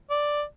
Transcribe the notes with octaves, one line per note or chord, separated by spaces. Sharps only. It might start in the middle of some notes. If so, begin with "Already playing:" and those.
D5